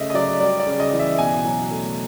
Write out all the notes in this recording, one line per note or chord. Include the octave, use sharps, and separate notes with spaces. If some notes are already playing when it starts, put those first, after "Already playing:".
Already playing: C#3 A3 D#5 E5
D#5
F#3 D5
G3 D5
D5
C#3
D#5
E3
E5
B2 G#5
F#3
A3